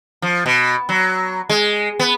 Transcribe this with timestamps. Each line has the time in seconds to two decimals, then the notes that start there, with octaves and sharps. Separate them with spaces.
0.22 F3
0.46 B2
0.89 F#3
1.49 G#3
1.99 B3